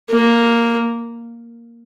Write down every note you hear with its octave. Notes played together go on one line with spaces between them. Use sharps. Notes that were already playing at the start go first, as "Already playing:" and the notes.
A#3